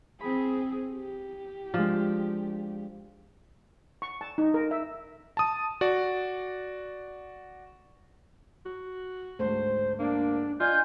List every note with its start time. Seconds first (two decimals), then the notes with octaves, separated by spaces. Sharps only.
0.21 C4 G#4 B5
0.92 G4
1.74 F3 G#3 D4
4.02 C#6
4.21 A5
4.38 D#4
4.54 A#4
4.71 E5
5.37 A5 D#6
5.81 F#4 D5
8.66 F#4
9.39 D2 G#2 C5
9.99 A#3 D4
10.60 F4 D5 D#5 G#5 G6